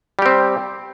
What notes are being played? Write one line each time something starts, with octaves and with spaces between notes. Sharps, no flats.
G3 C4 G4